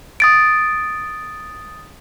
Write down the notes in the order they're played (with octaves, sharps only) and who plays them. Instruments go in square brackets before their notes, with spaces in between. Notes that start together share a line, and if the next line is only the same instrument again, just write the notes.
[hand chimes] D#6 A6 D7